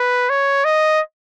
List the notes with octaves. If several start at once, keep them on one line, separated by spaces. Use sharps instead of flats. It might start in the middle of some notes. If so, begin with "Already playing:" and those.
Already playing: B4
C#5
D#5